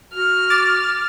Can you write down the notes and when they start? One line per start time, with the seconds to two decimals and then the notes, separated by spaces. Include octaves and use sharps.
0.14 F#4 F6
0.50 D6 A6 E7